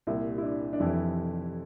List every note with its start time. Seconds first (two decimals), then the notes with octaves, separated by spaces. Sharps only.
0.07 C2 A#2 G3 E4
0.38 E4
0.43 D4
0.73 D4
0.80 F1 F2 E3 E4